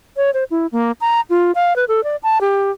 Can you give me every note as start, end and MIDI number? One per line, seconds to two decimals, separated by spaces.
0.17 0.31 73
0.34 0.44 72
0.51 0.67 64
0.72 0.92 58
1.01 1.21 82
1.30 1.52 65
1.55 1.76 77
1.76 1.85 71
1.88 2.03 69
2.04 2.16 74
2.23 2.41 81
2.41 2.71 67